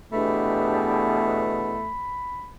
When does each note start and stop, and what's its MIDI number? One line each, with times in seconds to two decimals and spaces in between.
0.12 1.80 40
0.12 1.80 47
0.12 1.94 57
0.12 1.71 62
0.12 1.71 67
0.12 1.71 68
0.12 2.51 83